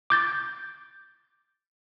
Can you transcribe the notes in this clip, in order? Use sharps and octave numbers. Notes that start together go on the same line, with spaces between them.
D6 G6 A6